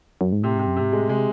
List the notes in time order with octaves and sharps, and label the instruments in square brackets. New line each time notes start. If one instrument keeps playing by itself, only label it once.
[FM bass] F#2
G#2
[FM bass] A2 [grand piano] C3
[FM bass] G#2 [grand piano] C3
[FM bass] F#2
[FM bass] G#2 [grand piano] C3
[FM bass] A2 [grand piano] G#3
[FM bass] C3 [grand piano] G#3